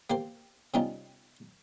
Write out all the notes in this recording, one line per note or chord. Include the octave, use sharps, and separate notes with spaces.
A#3 G4 C5
C3 G3 C#4 D#4 F4